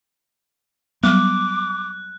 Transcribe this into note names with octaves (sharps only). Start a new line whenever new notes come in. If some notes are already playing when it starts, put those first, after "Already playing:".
F#3 G3 B3 D6 F#6